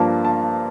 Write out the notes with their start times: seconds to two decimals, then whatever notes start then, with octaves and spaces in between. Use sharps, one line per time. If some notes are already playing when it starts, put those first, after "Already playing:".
Already playing: G2 F3 A#3 A5
0.25 A5